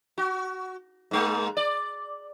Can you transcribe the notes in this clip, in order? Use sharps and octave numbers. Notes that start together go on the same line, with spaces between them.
F#4
G#2 G#3 A#3
D5